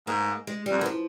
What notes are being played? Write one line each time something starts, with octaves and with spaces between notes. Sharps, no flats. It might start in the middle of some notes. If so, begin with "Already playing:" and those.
G#2 A#3
G#3
G3
F2
F#2
E3
F3